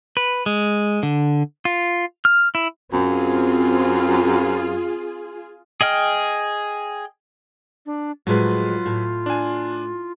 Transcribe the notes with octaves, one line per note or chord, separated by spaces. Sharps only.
B4
G#3
D3
F4
F6
E4
F#2 C4 F4 G#4
G#4 D#5 G5 F6
D4
A2 F3 F#3 G#3 F4 B4
A2
D4 G#5